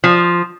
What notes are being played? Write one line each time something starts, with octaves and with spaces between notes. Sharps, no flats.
F3